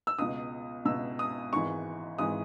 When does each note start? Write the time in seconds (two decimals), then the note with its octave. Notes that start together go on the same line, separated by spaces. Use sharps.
0.07 E6
0.18 C#2 B2 D#6
0.85 C#2 B2 E6
1.19 D#6
1.53 G#1 G#2 E3 C#6
2.18 G#1 G#2 E3 D#6